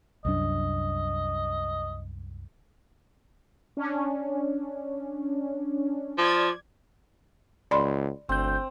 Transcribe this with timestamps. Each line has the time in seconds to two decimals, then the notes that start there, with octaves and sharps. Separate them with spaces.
0.25 C2 F#2 D4 D#5
3.77 C#4 D4
6.18 F3 D5 G#6
7.71 C#2 D5 B5 C6
8.29 G1 D2 C4 G6